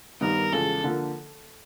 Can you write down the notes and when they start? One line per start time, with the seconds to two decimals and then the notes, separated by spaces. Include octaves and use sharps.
0.21 G2 D#3 G3 B3 D#4 A#4
0.52 E2 C#3 F3 G#3 A4
0.84 D3 F3 A#3